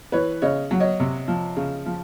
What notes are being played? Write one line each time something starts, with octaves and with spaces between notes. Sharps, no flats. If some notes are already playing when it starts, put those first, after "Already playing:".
E3 B4 C#5
C#3 C#5 D#5
F#3
C#5 D#5
C3
F3
C#3
F3